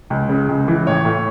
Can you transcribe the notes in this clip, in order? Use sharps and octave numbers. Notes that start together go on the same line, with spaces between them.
C#2
C#3
C#2
E3
A1 C#5
A2